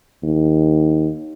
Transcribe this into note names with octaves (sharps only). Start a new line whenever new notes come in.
D#2